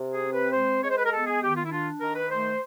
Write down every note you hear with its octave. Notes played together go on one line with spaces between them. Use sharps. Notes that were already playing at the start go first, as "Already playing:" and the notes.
Already playing: C3
G#4
C4
B4
G#3 C5
G#3 C#5
C5
B4
A#4
B3 A4
G#4
D#3 G4
F4
E4
D4 F4
D#3 A#4
B4
A3 C5